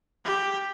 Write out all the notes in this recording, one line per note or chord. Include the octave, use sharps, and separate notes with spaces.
G4